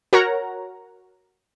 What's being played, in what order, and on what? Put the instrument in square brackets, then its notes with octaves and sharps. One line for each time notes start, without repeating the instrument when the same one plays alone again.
[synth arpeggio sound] F#4 A#4 C#5 F#5 A#5